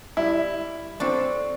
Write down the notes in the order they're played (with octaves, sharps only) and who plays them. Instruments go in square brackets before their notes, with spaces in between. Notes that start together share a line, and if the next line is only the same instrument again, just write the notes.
[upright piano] G3 [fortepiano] E4
[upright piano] C4 C#6 [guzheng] D4 A4